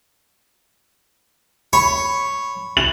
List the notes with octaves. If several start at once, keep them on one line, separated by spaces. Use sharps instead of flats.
C#5 B5
F#7